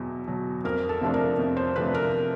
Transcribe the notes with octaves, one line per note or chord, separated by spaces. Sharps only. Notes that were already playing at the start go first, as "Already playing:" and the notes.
Already playing: E2 B2 F#3
B2 F#3
F2 A#4
A4
C3 F3 A3 D4
A#4
F2
C5
C3 F3 A3 D4 B4
A#4